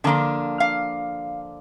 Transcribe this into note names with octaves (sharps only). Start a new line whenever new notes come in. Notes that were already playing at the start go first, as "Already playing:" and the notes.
D3 F3 A#3 D4 A5
F5